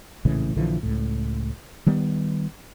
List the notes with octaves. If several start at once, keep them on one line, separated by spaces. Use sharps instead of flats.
A#1 A2 C#3 E3
A#1 D3 E3 F3
C#2 A2
D#3 G3 B3